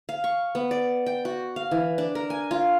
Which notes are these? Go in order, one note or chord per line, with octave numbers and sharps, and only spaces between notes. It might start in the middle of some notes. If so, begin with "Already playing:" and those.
F5
C#6
B3
D5
G5
F#4
F5
E3
D4
A#4
G#5
F4